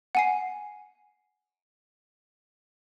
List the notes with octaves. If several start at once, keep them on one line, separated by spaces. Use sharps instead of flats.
F#5 G#5 C7